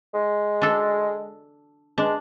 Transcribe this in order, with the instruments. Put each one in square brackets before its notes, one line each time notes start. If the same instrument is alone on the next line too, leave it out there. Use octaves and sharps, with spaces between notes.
[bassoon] G#3
[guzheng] D4 A4
[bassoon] G#3 [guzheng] D4